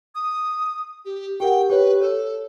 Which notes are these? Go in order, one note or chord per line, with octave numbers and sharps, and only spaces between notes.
D#6
G4
G4 A#4 F#5 G5
G4 B4 C#5
A4 C#5